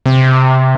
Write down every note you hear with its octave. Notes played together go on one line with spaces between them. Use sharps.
C3